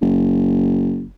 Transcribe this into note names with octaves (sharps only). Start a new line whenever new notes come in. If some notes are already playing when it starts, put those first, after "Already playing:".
F#1